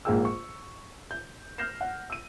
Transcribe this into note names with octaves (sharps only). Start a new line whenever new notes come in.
A#1 G#2 A#3 G#4 G5 E6
C#6
G6
F6 G6 A#6 C7 E7
F#5
E6 D#7